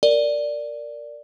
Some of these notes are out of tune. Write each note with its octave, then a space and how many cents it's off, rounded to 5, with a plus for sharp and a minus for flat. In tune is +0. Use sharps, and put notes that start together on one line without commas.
A#4 -10 D5 +0